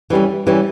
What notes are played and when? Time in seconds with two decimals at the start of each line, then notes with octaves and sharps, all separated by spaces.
0.10 E3 G3 C#4
0.47 E3 G3 C#4